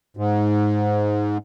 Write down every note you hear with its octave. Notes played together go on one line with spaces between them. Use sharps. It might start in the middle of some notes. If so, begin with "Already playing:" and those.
G#2